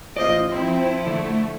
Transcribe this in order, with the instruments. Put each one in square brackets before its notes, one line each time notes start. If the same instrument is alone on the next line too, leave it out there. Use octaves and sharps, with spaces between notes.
[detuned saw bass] A1 [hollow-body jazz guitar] F4 C5 D5 [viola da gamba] D#5
[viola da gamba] F3 E4 [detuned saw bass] C4
[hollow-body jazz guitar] D3 [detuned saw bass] A3